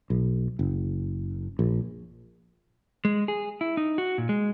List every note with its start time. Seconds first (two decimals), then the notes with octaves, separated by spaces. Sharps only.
0.10 B1
0.59 F#1
1.59 A#1
3.05 G#3
3.28 G#4
3.61 E4
3.77 D#4
3.98 F#4
4.18 A#2
4.29 G#3